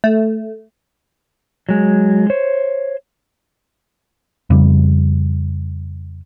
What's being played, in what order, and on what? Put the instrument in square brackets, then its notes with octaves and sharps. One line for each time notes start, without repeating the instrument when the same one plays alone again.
[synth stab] A3
[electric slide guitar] F#3 G#3
C5 C#5
[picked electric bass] F2 C#3 G3